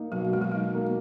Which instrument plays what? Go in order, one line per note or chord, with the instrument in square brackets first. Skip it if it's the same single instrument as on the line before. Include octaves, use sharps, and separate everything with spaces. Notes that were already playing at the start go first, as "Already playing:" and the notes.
Already playing: [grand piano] A#3 D#4
[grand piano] B2 [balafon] F#3
[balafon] G#3 [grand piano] F#4
[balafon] F#3
[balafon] G#3 [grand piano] D#4
[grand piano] A#3